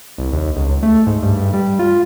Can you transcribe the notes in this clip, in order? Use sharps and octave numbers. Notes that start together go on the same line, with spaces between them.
C2
D#2
C#2
A3
G#2
G2
G3
F4